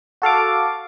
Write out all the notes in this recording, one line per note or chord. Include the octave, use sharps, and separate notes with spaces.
F#4 A4 F5 D6